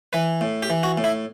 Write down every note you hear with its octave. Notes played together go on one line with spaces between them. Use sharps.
E3 B4
A2
G4
E3
F#4
A2
E4